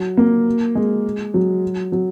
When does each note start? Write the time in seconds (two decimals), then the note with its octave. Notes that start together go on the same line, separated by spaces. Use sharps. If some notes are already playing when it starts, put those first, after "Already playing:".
Already playing: F#3
0.17 A#3
0.75 G#3
1.34 F#3
1.92 F#3